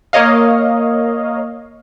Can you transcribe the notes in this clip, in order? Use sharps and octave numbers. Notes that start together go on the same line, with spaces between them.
A#3 C#5 D#5 F5